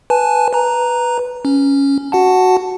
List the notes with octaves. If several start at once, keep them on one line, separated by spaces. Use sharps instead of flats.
B4 G#5 A5
B4 A#5
C#4
F#4 F#5 A5